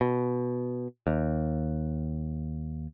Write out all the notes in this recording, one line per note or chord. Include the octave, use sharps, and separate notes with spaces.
B2
D#2